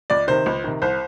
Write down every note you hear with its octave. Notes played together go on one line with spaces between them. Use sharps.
C#2 D5
C3 D#3 C5
C#2
C3 D#3
C2 C5